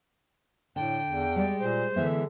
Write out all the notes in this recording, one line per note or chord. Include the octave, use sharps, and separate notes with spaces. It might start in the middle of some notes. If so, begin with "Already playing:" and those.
A2 D3 G5
E2
G3 G#3 D5
A#2 C5
D3 E3 G#3 B3 E5